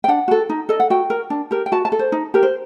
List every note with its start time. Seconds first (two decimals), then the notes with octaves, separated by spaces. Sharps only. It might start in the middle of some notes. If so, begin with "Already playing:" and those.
0.04 G5
0.08 D4 F#5
0.28 F#4 A4
0.49 D#4
0.69 A4 D#5
0.80 F#5
0.90 F#4 G5
1.10 A#4
1.30 D4
1.51 G4 A#4
1.66 G5
1.72 F#4 A5
1.85 A5
1.92 A4
1.99 C5
2.12 D#4
2.34 G4 A#4
2.43 C5